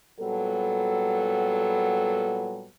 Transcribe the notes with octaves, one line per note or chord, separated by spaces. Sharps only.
A#2 F#3 G3 B3 A4